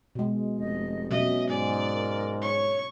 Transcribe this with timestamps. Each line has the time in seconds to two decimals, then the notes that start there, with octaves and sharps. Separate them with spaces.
0.15 B2 G#3
0.58 F1 D#5
1.11 B2 F#3 C#4 D#5 E5
1.50 G#2 D5 G#5
1.93 A#4
2.42 C#5 C#6